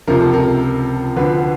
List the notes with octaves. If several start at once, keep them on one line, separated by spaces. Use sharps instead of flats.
C#2 C3 F3 A#4
A4
A#4
D2 D3 F3 B4